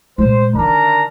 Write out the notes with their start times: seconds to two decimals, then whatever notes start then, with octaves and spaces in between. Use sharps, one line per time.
0.18 A#2 G#3 C5
0.54 D3 D#3 D4 A#4 A#5